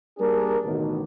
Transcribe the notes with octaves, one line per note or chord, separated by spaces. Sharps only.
G3 A#3 D4 G#4 A#4
A1 B2 D#3